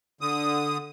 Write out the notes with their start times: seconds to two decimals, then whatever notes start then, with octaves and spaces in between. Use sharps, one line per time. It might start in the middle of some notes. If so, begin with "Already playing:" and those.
0.21 D3 D#6